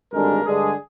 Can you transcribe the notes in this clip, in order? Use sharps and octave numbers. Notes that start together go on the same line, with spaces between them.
G#1 G2 D3 G#3 D4 A#4
G2 D3 G#3 D4 G#4